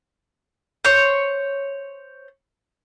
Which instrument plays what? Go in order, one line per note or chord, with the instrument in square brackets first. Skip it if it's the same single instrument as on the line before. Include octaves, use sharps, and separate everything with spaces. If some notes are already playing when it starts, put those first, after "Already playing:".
[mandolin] C5 C#5